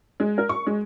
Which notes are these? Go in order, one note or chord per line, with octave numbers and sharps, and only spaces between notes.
G#3
A#4
C#6
G#3